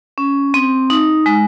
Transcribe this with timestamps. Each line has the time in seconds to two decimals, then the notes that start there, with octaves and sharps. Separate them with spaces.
0.18 C#4
0.54 C4
0.90 D#4
1.26 G#3